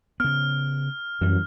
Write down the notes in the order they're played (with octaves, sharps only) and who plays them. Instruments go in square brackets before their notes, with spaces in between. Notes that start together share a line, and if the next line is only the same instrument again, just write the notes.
[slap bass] C#3 B3 [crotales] F6
[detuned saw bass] F#2 [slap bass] E3 G3